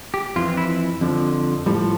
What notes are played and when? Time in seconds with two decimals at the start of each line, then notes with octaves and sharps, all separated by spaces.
0.14 G4
0.36 F2 E3 F4
0.57 E4
1.01 F2 D3 F3
1.66 A2 F3 G3